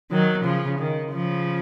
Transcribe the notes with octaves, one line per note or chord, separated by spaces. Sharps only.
D#3 F#3
C#3 F3
D#3
C#3 F3